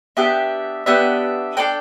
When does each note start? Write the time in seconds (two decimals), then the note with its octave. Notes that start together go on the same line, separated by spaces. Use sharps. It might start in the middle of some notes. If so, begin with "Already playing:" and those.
0.17 B3 D4 G4 E5
0.86 B3 D4 G4 E5
1.57 D4 A4 D5 G5